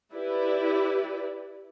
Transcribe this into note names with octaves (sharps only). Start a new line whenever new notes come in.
E4 G4 B4 D5